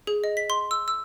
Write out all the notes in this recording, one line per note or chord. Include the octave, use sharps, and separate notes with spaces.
G#4
D#5
B6
C6
E6
E6